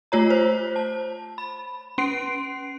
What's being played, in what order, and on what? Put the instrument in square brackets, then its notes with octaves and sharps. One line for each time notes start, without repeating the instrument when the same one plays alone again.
[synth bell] A3 F4 C#5 A#5
C5
A5
B5
C#4 C6 C7 D7